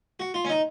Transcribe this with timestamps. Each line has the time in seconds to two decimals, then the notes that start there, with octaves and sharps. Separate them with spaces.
0.20 F#4
0.34 F4
0.45 C#4
0.49 D#4